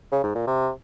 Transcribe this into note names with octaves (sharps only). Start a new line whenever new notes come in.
C#3
G#2
A#2
C3